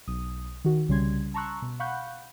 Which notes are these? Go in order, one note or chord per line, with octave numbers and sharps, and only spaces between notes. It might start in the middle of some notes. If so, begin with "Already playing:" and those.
B1 D#6
D#3 F#4
C2 C#3 G3 C#4 C6 G#6
A5 A#5 C6 C#6 E6 F#6
B2
F5 F#5 B5 C#6 F#6 G6